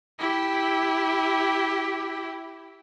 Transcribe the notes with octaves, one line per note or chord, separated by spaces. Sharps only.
E4 G4